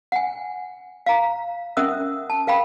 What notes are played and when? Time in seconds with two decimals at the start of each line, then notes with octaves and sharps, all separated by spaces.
0.12 F#5 G#5
1.06 F5 A#5
1.77 C#4 A#4 E5 F#5 D#6 E6
2.30 A5
2.47 A#4 F5 G5 B5